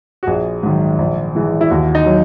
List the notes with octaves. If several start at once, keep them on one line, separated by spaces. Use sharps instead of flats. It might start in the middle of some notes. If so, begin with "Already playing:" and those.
F#4
A#1 G#4
G#2 D#3 F#3
A#1
G#2 E3 G#3
E4
D#2 F#4
D#4
F#3